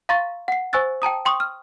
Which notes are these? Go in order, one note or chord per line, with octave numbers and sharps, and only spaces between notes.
F5 A#5 C6 C#6 A6
F#5 C7
C5 G#5 C#6 E6 F#6 A6
G5 A5 A#5 D#6
G5 C6 C#6 D#6
F6